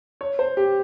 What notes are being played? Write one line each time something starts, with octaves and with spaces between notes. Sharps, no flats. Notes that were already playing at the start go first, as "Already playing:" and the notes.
C#5
C5
G4